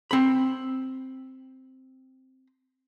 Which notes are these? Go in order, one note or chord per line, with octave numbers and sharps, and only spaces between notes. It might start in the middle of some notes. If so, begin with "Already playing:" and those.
C4 B5